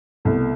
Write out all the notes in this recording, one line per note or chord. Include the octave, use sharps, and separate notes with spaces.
C2 B2 A3